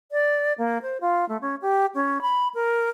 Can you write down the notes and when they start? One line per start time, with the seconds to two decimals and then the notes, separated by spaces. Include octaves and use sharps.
0.12 D5
0.58 A#3
0.82 C5
1.01 F4
1.29 A3
1.41 C#4
1.62 G4
1.95 C#4
2.22 B5
2.54 A#4